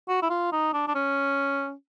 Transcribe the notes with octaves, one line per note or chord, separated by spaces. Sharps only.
F#4
E4
F4
D#4
D4
D4
C#4